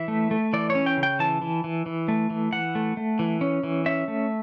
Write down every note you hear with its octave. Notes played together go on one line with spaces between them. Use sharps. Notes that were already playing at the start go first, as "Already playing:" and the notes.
Already playing: E3 E5
A3
A3
E3 D5
C#5
C#4
G5
C#3
G5
E3 A5
E3
E3
E3
A3
E3
E3 F#5
A3
A3
E3
C#4
E3
C#4 E5
A3